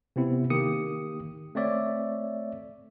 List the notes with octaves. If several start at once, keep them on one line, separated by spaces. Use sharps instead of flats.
C3 B3 C4 E4
D#3 A#3 G4 D#6 C#7
A3 C4 C#5 D5 E5